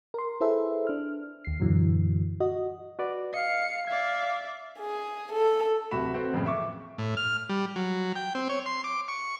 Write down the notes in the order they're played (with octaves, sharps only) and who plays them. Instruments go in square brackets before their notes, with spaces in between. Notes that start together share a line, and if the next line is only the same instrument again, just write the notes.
[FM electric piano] A#4 C6
E4 G#4 A4 B4 C5 E5
D4 F6
D#2 C7
F#2 A#2 D3 E3 F#3
F#4 D#5
[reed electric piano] F#4 B4 D5
[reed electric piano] D#5 [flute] F5 [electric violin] C#7
[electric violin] D5 E5 [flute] F5 [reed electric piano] G#6
[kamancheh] G#4
A4
[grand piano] D1 C3 A3 F#4 B5 E7
C4 F#4 A4 B4 C5
F#1 F2 A2 C#3
E5 C#6 D6
[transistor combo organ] A2
F6
G3
F#3
G5
C4
C#5
C6
D6
C#6